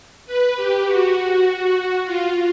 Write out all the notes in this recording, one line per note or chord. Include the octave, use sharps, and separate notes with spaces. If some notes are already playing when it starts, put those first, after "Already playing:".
B4
G4
F#4
F4